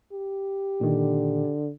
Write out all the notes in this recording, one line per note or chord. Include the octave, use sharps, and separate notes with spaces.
G4
A#2 D3 D#3